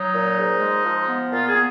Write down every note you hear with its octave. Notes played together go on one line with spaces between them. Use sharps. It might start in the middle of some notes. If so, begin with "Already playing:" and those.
Already playing: F#3 D#4
A#2
G#2
G#3
F3
B3
A#2 F4
G#4
B3